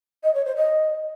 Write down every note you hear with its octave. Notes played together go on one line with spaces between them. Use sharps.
D#5
C#5
C5
D#5